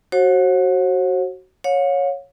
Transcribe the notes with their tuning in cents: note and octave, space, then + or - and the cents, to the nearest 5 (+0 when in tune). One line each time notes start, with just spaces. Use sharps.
F#4 +15 C5 +45 F#5 -35
C#5 +0 F5 +45